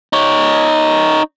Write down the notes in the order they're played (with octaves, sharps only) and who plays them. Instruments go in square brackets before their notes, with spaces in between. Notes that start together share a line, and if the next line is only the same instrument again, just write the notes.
[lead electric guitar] D#4 C#5